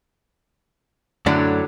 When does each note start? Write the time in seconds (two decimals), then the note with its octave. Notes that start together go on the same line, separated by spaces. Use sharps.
1.26 F#2 A2 D3 F#3 A3 D5